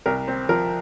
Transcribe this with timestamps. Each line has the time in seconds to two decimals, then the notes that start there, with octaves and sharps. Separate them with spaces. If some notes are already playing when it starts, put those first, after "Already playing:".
0.06 C2 A#4
0.28 C4
0.49 F3 A#4